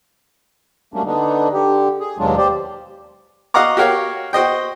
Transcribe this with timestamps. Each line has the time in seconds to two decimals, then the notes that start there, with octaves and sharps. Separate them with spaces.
0.94 F#3 G3 A3 A#3 C#4 D4
1.05 D3 B3 D4 D#4
1.52 D3 G4
2.00 G#4
2.19 D#2 B2 F#3 G#3 D4 F4
2.37 G4 C5 D5
3.54 F#4 D#5 F5 F#5 A#5 D6
3.77 F#4 G4 A#4 C#5 F5
4.33 F#4 C5 D#5 G5